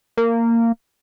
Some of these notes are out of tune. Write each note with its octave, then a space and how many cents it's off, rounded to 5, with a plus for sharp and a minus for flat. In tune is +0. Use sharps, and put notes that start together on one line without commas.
A#3 -15